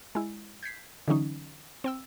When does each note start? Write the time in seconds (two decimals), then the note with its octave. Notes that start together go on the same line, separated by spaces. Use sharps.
0.15 G#3 E4
0.63 G6 G#6 B6 C7
1.08 D3 E3 F#3 C#4 D#4
1.84 C4 G5 E6